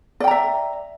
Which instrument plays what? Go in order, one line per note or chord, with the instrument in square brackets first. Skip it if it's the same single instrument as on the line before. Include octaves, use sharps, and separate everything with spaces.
[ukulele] D5
G5
A#5
E5